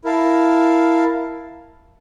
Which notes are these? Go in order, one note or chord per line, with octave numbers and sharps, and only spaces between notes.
E4 A#4 F5 A5